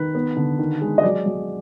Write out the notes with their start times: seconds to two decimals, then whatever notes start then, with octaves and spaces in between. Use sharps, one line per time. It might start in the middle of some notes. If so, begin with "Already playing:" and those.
Already playing: D#3 B4
0.15 B3
0.37 D3
0.59 D#3
0.81 G#3
0.98 D#5
1.03 F#3 D5
1.26 F#3